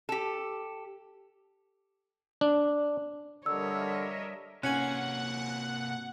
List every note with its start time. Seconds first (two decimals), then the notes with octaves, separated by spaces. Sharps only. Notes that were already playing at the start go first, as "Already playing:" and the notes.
0.09 G4 A4
2.41 D4
3.46 D3 G3 A#4 C#5 D#5 E5 E6
4.63 C3 A#3 C#4 F#5 G#5 F#6 C#7 F#7